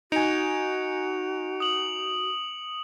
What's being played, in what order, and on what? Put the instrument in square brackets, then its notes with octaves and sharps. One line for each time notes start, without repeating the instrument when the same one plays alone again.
[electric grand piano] D#4 G#5 [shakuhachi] F#4 [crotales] C#7 D7 F7
[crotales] D#6 F#7